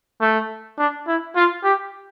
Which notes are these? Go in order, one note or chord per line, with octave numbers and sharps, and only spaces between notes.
A3
D4
E4
F4
G4